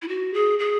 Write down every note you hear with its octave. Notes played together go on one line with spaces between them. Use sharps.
E4
F#4
G#4
G#4